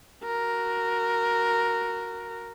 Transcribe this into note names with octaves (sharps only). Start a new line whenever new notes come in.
F#4 A#4